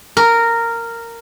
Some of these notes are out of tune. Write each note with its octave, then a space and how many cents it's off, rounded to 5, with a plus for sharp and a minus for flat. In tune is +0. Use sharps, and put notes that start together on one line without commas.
A#4 -10